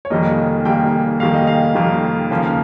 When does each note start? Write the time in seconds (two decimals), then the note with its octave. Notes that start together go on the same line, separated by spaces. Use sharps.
0.05 C#5
0.10 F1 F2 D#3 G3 A#3 D#5
0.65 F1 F2 D#3 G3 A#3 G5
1.20 F1 F2 D#3 G3 A#3 F5
1.34 D#5
1.47 F5
1.75 F1 F2 D#3 G3 A#3
2.30 D#2 C#3 F3 A#3